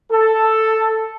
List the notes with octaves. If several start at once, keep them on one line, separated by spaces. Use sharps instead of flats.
A4